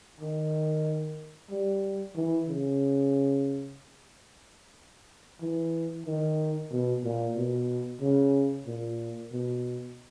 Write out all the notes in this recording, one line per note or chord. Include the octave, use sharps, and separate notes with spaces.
D#3
G3
E3
C#3
E3
D#3
B2
A#2
B2
C#3
A#2
B2